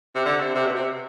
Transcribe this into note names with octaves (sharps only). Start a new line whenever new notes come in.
C3
D3
C3
C3
B2
C3